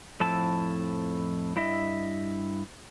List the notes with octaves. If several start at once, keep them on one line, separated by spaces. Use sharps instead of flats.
F2 A2 F3 E4 A4 A5
G2 E4 D#5 E5